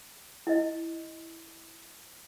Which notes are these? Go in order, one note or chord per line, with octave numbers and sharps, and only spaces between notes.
E4 D#5